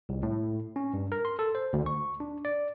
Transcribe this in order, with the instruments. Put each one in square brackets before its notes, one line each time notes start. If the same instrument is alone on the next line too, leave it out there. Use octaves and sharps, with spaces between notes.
[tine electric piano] C2
A2
C#4
G2
A#4
C6
A4
C5
D2
C#6
D4
D5